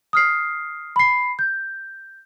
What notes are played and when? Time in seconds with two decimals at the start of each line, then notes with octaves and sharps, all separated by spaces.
0.13 D#6 F6 C7
0.96 B5 C7
1.39 G6